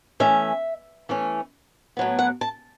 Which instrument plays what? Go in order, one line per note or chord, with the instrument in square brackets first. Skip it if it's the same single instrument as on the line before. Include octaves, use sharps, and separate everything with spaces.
[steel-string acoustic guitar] E3 A3 C#4 E5
E3 A3 C#4
A2 F#3 B3
F#5
A5